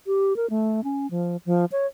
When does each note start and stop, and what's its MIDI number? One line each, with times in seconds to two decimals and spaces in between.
0.07 0.36 67
0.36 0.49 70
0.50 0.84 57
0.84 1.09 61
1.11 1.37 53
1.46 1.65 53
1.72 1.86 73